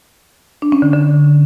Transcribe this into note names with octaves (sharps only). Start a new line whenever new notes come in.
D4
C#4
D3
D3